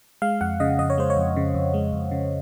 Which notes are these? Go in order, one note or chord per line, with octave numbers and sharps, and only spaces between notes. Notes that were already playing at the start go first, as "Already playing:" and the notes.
G#3 F5
F2 F#5
C#3 D#5
F2 D#5
C#5
G#3 C5
C#5
F2
C#3
F2
G#3
F2
C#3